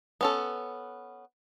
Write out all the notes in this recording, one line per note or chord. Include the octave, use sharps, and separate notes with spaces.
B3 C#4 A4